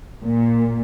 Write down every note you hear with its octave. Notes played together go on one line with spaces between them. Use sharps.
A#2